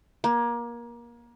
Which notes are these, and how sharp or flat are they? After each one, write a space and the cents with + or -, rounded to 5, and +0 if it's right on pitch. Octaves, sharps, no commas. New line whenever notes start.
A#3 +25